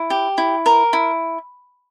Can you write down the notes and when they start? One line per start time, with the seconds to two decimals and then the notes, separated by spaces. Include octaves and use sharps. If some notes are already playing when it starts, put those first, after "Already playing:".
Already playing: E4
0.10 G4
0.38 E4
0.66 A#4
0.93 E4